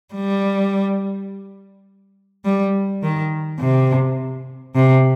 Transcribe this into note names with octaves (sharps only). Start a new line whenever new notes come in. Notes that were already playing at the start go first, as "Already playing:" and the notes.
G3
G3
D#3
C3
C3